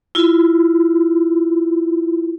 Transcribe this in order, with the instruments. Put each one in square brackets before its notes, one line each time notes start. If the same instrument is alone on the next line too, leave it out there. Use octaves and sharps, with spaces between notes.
[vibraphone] E4 F4